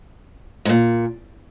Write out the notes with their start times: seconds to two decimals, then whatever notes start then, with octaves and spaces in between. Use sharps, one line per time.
0.65 G#2
0.69 A#2